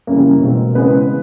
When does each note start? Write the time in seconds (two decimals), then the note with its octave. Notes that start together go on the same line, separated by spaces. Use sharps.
0.07 F#2 C#3 E3 G3 A#3 A#4
0.41 B2 G#3 C4
0.75 C#3 E3 G#3 B3 C4 B4